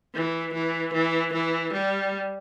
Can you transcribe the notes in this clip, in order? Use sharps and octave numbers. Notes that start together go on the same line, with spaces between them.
E3
E3
E3
E3
G3